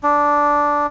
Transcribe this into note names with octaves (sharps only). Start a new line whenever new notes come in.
D4